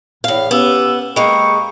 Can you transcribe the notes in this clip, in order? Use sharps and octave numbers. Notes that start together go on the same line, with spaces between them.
E2 A2 F5
B3 C#4 G4 E6
G#3 A#3 G5 B5 C#6